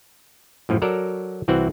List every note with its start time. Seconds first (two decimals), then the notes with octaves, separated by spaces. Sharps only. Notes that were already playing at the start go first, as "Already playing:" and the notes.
0.69 F#2 A2 F3
0.82 F#3 A4 A#4 D5 A#5
1.48 C2 E3 C4 F#4 F#5